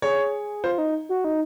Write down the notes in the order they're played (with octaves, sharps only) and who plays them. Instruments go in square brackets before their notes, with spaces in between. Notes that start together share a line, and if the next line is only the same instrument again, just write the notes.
[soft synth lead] G#4 [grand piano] C#5
[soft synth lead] F4 [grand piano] C5
[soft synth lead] D#4
F#4
D#4